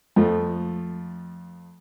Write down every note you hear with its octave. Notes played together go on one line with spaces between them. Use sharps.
F2 F3 A3